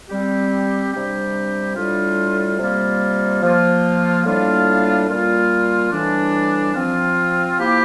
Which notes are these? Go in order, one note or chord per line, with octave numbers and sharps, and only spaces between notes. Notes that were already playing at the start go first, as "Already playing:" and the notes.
G3 C4 G4
C3 G3 D4 G4
A2 G3 D4 F4
C3 G3 A#3 F4
F3 A#3 F4
A2 G3 A#3 D4 F4
A#2 G3 A#3 F4
A2 E3 G3 D4
F3 C4 F4
F3 A#3 E4 G4